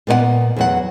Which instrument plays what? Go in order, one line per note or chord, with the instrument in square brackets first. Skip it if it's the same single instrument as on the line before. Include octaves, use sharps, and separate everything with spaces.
[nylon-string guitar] A#2 B3 C#5 F#5
E2 F#3 F#5